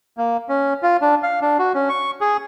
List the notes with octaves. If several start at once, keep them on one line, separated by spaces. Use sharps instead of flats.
A#3
C#4
F4
D4
F5
D4
F#4
C#4
C#6
G#4